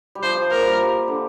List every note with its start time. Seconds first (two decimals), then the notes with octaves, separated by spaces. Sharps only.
0.15 G3
0.23 F3 C5
0.38 F3
0.51 A#3 A#4
0.62 G3
0.72 F3
0.83 G3
1.08 D3